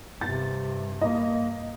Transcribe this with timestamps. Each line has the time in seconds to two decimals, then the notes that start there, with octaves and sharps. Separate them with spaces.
0.21 G2 C3 A6
1.01 A#3 D#5